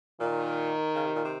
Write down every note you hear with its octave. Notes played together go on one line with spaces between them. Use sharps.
A#2 D#3
C#3
C3
A#2
C3